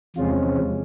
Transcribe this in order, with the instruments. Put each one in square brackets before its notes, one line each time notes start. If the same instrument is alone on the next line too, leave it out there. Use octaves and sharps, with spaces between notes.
[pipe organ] E2 C3 F3 G#3 C#4 F4